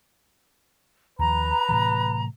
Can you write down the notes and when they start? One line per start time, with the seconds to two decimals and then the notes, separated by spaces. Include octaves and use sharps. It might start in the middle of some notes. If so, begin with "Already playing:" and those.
1.19 D#2 F3 B4 A#5
1.69 A2 C3 E3